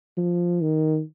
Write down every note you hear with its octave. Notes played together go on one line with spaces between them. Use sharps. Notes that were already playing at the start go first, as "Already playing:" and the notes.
F3
D#3